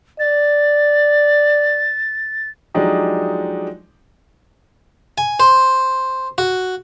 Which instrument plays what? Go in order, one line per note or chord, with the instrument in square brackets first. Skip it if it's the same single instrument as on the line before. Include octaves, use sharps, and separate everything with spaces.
[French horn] D5 [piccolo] A6
[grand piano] F3 F#3 G#3 D4 D#4 G4
[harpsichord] G#5
C5
F#4